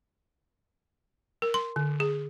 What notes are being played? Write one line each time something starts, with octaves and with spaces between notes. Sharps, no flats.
A#4
C6
D3
G#4